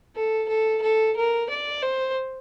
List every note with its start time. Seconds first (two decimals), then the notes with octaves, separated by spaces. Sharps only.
0.15 A4
0.48 A4
0.82 A4
1.16 A#4
1.49 D5
1.82 C5